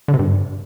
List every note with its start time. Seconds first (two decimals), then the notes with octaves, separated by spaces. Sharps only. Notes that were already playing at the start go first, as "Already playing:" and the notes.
0.08 D3
0.14 C3
0.19 G2